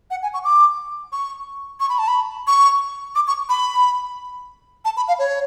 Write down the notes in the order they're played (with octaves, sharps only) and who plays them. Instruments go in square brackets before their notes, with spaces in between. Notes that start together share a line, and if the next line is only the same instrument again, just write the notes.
[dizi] F#5
G#5
C#6
D6
C#6
C#6
B5
A5
B5
C#6
D6
C#6
B5
A5
B5
F5
C#5